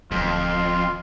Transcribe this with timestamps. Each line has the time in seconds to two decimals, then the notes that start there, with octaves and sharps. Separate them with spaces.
0.11 D1 F2 F4